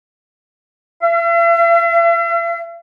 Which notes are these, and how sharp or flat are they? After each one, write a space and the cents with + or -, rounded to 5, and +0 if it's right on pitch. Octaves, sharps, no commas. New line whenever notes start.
E5 +45